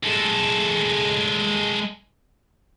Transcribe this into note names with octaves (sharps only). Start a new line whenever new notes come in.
G#3 A4